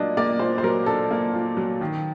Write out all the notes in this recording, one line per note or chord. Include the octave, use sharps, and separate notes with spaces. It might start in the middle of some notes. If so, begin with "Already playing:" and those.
Already playing: A#2 F#3 A#3 D4 D#5
A#3 D5
A#2 C5
C5
F#3 A#4
D4 A4
A#3
A#2
F#3
D#3